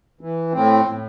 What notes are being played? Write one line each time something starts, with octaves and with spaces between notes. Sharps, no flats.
E3
A2 C4
A2